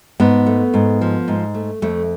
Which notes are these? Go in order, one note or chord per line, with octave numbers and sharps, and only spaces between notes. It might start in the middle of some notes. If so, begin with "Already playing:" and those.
G#2 B3
A3
G#2
F3
G#2
A3
F2 A3